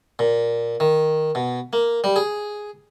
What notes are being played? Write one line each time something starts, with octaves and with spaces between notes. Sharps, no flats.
A#2
D#3
B2
A#3
G3
G#4